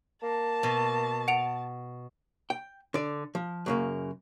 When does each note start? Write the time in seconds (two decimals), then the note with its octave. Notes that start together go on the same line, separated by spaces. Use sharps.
0.23 A#3 A5
0.63 B2
1.28 F#5 D7 F7
2.50 G5
2.94 D3 D5
3.35 F3
3.66 F#2 C#3 A#3